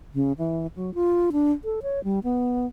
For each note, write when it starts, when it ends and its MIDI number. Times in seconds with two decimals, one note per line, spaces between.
0.14 0.32 49
0.38 0.67 52
0.76 0.93 54
0.94 1.30 65
1.32 1.52 62
1.64 1.80 69
1.83 2.03 73
2.04 2.19 55
2.24 2.66 59